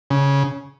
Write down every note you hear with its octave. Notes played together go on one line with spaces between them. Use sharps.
C#3